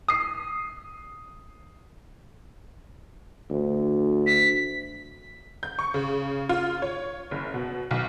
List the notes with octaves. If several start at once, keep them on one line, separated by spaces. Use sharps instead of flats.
D#6 C7
D2
B6
G6
C#6
C#3
F4
C#5
F#1
B2
B1